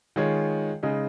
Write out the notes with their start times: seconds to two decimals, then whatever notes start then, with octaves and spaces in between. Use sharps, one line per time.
0.16 D#3 G#3 F4 C#5
0.83 C#3 G#3 D#4